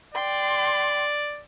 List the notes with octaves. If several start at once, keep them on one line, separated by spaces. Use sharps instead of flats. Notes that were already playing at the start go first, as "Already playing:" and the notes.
D5 G5 C6